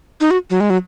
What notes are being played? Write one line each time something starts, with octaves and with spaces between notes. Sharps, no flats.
D#4
F#4
F#3
G#3
F#3